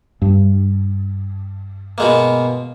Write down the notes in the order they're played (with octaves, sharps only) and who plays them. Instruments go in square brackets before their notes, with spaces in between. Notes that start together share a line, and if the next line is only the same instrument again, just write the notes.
[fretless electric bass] G2
[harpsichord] B2 G#3 A#3